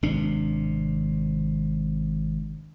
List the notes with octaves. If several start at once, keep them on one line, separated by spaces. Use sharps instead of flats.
G#1 C3 D4